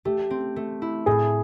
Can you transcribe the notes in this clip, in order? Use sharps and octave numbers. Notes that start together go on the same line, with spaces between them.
A3 G4
C4
A3
E4
A2 G#4